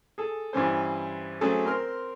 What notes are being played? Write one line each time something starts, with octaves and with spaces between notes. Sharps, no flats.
G#4 A4
G2 E3 C#4 C5
F#3 A3 C4 C#4 G#4 A4
C4 A#4 C6 F6